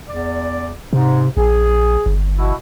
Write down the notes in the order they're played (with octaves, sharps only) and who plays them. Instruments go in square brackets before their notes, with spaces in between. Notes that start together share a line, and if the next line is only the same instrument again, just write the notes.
[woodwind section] E2 D5
[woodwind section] G#2 [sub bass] C3
[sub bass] A#1 [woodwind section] G#4
[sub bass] G1
[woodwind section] B2 E4 F#4